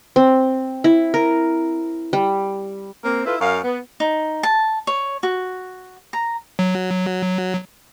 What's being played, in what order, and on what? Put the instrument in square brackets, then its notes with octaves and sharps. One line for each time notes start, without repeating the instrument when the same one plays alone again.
[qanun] C4
E4
A#4
G3
[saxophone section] A#3 C4
E4 F4 A4 B4
F#2 F5
B3
[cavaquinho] D#4
A5
C#5
F#4
A#5
[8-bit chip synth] F#3